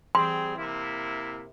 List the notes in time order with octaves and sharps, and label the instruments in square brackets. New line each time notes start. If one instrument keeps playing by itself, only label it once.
[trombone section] G3 C4 G#4 [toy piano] C6
[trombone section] C3 A#3 E4